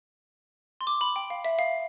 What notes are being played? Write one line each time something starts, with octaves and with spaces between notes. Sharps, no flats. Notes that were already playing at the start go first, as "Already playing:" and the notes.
C6
D6
B5
G5
F5
E5
F5